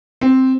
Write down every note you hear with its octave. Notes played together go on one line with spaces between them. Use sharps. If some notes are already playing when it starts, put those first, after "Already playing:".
C4